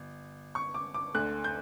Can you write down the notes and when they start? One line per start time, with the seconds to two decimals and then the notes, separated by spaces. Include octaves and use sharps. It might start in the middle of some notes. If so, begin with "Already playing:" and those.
Already playing: G1
0.55 C#6
0.74 D6
0.94 D6
1.14 D2 D3 A3 F#6
1.44 G6